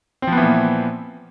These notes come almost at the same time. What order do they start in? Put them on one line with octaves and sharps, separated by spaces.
C4 F3 B3 E3 A#2